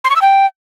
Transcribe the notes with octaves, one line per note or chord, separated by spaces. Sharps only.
C6
C#6
E6
G5